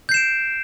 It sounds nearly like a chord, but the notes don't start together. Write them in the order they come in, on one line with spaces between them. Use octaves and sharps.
G6 C7 E7 D7